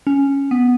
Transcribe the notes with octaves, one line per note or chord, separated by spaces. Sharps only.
C#4
B3